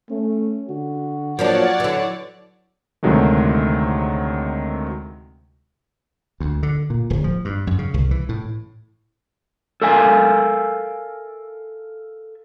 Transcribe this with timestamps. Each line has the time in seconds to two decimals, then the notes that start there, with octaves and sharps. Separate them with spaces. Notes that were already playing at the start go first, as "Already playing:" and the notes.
0.10 A3 C#4
0.69 D3 F#4
1.39 F3 F#3 A#3 D4 C#5 D5 F#5
1.80 D3 E3
3.03 D2 C3 D#3 F#3 G#3 A3
6.40 D2
6.63 D3
6.90 A#2
7.10 D1
7.24 F3
7.45 G2
7.67 F#2
7.79 C#3
7.94 C2
8.11 E3
8.29 A2
9.82 A4 A#4 E5 F5 G#5